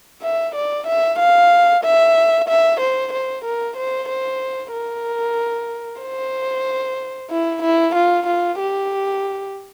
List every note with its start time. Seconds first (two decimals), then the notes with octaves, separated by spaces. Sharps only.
0.22 E5
0.55 D5
0.87 E5
1.19 F5
1.84 E5
2.48 E5
2.80 C5
3.13 C5
3.44 A#4
3.77 C5
4.09 C5
4.73 A#4
6.01 C5
7.30 E4
7.62 E4
7.95 F4
8.26 F4
8.59 G4